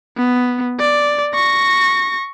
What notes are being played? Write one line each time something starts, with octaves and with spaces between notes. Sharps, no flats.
B3
D5
C#6 A#6